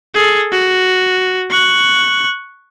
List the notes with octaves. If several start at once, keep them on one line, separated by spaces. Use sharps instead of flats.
G#4 A4
F#4
C#6 F#6